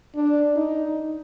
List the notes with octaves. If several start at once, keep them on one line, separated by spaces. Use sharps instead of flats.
D4
D#4